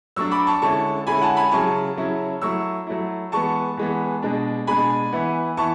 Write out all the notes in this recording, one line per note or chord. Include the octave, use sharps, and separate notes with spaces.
F#3 A3 D4 C#6 E6
B5 D6
A5 C#6
D3 G#3 C#4 E4 A5 C#6
D3 G#3 C#4 E4 G#5 B5
F#5 A5
G#5 B5
C#3 F#3 C#4 E4 A5 C#6
C#3 F#3 C#4 E4
F#3 A3 E4 C#6 E6
F#3 A3 E4
E3 G#3 B3 A5 C#6
E3 G#3 B3
B2 G#3 D4
B2 G#3 D4 G#5 B5
E3 B3 E4
E3 B3 E4 A5 C#6